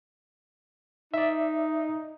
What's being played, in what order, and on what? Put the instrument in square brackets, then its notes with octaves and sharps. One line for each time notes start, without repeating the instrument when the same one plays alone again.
[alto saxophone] D#4 [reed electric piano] D5 E5